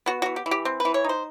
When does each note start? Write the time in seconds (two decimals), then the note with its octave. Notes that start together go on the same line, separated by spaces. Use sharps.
0.06 B3 F#4
0.22 E3 F#4
0.36 G4
0.46 E3
0.51 G4
0.65 C4
0.80 B4
0.85 E3
0.94 C#5
1.04 D#4 C5